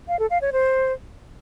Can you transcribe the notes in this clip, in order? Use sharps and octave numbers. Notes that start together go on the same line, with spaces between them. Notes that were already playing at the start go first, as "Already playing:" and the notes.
F5
A4
F5
C#5
C5